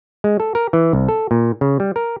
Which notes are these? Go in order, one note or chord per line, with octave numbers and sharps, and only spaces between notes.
G#3
A4
A#4
E3
C2
A4
A#2
C#3
G3
A#4